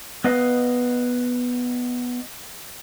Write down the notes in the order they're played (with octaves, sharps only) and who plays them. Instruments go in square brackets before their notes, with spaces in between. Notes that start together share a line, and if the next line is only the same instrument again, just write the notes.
[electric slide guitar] B3 B4 D#5 F5